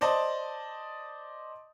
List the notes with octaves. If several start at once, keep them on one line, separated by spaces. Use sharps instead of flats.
C5 D5 D#5 A5